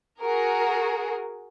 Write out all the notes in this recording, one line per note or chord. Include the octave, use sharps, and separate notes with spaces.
F#4 G#4 A#4